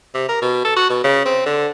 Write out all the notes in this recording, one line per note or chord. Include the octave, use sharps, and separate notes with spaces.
C3
A#4
B2
A4
F#4
B2
C#3
C4
D3